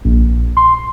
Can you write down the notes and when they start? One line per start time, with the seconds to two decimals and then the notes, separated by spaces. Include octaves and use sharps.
0.05 A#1
0.57 C6